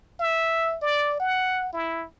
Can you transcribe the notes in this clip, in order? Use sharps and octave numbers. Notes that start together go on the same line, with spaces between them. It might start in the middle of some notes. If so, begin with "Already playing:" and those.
E5
D5
F#5
E4